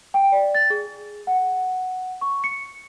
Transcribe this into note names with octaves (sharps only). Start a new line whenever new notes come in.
G5
D5
A6
G#4
F#5
C#6
C#7